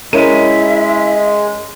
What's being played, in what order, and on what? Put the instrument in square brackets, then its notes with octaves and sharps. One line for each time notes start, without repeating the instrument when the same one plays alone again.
[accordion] G#3 [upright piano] C#4 A#4 D#7 [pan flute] E4 [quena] E5